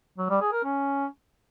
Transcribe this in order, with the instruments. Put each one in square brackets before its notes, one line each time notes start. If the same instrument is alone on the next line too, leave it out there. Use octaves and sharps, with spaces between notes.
[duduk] F#3
G3
G#4
A#4
C#4